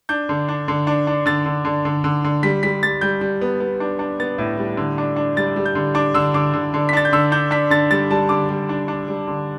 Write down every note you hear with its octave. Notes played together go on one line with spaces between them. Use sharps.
D4 G6
D3
D4
D3
D4
D4
D3 A6
D3
D3
D3
D3
D3
G3 B6
G3 B6
G3 A6
G3 G6
G3
B3
B3
D4
D4
B3 A6
A2
G3
D3
D4
D4
G3 A6
G3
G6
D3
D4 D6
D3 E6
D3 D6
D3
D3
B6
D4 A6
G6
D3 E6
D4 G6
D4 B6
D3 A6
G3 A6
G3 A5
D3 D6
G3
D4
D4
G3
D3